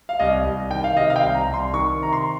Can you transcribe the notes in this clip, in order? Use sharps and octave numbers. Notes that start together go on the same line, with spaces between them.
F5
C2 D#5
C2
D#3 G5
F5
C3 D#5
F5
G5
C2
A#5
C2
C6
D#3 C#6
C3 A#5
C6